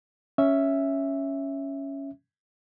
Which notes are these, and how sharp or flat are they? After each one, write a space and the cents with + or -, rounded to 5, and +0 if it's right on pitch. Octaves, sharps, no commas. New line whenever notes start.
C#4 +0 E5 +0